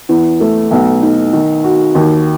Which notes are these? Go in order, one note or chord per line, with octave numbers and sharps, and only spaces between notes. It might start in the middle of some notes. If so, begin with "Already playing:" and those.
E2
A3
B1
D#4
D#3
F#4
D#2